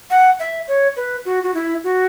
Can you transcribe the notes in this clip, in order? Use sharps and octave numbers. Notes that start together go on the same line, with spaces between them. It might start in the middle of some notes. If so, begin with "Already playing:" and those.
F#5
E5
C#5
B4
F#4
F#4
E4
F#4